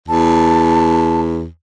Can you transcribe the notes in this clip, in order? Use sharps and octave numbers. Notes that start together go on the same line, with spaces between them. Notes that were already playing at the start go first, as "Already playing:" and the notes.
E2 A5